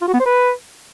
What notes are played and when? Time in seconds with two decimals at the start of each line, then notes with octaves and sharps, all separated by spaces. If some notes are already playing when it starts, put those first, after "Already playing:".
0.02 F4
0.08 F#4
0.14 B3
0.20 C5
0.26 B4